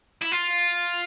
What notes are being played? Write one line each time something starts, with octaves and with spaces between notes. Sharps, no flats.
E4
F4